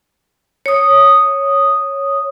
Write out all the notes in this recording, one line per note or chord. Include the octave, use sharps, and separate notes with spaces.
C#5 D#6